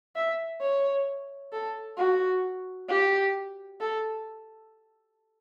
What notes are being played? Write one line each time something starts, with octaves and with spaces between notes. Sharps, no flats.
E5
C#5
A4
F#4
G4
A4